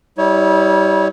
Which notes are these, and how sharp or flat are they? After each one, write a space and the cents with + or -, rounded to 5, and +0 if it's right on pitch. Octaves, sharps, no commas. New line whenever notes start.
G3 -15 E4 -40 C#5 +5